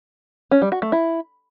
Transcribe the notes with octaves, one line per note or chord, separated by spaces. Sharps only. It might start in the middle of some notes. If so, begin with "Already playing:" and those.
C#4
G3
F#4
A3
E4